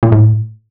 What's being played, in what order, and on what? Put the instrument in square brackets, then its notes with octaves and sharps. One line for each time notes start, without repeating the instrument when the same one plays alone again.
[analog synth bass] A#2
A2